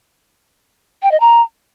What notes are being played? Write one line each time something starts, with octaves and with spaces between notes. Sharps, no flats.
G5
D#5
A#5